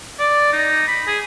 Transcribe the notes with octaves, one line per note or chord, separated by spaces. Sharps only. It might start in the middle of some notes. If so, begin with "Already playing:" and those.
D5
D#4
B5
G#4